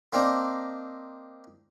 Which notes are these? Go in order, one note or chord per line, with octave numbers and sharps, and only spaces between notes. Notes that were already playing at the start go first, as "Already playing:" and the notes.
A#3 C4 D4 D#4